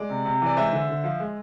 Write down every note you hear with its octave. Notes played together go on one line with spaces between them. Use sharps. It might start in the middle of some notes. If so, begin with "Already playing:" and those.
Already playing: G#3 D5
C3
C3
E3 D5
G#3 C5 E5
D3
D3
F3
G#3